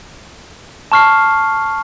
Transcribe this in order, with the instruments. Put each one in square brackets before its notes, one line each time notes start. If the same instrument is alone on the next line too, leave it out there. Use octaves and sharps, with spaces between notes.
[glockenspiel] A5 C#6 F6 C7